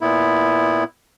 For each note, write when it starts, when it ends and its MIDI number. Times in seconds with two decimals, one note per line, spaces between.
0.01 0.84 46
0.01 0.84 59
0.01 0.84 64